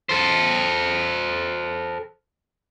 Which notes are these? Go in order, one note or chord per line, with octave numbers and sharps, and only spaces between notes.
A4 C5